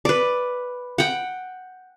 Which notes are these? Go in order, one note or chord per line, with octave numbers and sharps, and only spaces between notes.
B4 D5
F#5 G5